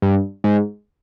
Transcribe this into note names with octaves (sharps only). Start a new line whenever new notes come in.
G2
G#2